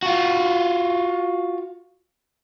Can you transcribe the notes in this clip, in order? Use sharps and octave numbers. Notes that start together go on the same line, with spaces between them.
F4 F#4